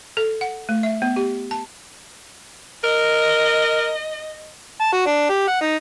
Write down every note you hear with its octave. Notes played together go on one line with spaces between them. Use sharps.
A4
F#5
A3
E5
B3
G4
A5
A#4 D#5
A5
F#4
D4
G4
F#5
D#4